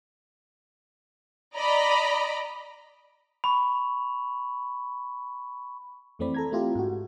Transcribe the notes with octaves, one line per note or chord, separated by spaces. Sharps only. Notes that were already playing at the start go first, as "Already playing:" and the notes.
D5 D#5 A#5 B5
B5 C#6
F2 E3 A3 C4 D5 B5
A4 A#5 G#6
A3 C4 E4 F4 G4 A4
G#2 F#4